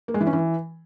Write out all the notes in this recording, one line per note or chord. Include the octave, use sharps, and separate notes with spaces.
A#3
G#3
E3
C#4
E3